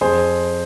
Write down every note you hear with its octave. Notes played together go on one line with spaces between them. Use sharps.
F2 G#4 C5